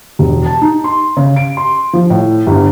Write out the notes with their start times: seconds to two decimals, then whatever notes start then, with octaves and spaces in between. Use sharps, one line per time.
0.19 E1
0.46 A5
0.62 D#4
0.84 C6
1.17 C#3
1.36 D7
1.57 C6
1.93 F3
2.10 A2
2.47 G1